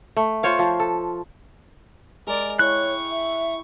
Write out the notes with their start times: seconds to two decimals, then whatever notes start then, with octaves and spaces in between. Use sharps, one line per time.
0.17 A3
0.43 F4 C5 C#5 F5
0.59 F3
0.80 A4
2.27 G#3 A#4 D5
2.59 E4 C#5 G5 C#6 F#6
3.10 E5